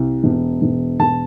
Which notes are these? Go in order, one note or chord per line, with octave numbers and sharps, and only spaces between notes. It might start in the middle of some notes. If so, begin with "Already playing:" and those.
Already playing: C2
E1
E1
E1 A5